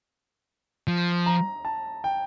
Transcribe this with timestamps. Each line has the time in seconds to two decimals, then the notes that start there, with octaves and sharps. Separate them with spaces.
0.88 F3
1.26 A#5
1.65 A5
2.04 G5